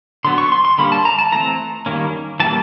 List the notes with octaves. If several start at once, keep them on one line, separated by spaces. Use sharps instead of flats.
D3 F#3 B3 C6
C#6
C6
C6
D3 G3 A#3 C#4 B5
A5
A#5
A5
E3 A3 C4 A#5
D#3 G3 A#3 C#4
E3 G3 A#3 C#4 A5